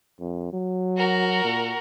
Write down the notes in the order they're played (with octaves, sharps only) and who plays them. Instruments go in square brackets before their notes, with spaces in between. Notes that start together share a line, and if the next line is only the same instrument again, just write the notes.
[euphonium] F2
F#3
[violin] F#4 A#4
[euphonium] A#2